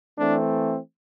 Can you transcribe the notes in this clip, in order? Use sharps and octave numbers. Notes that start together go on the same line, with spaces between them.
E3 A3 C4 D4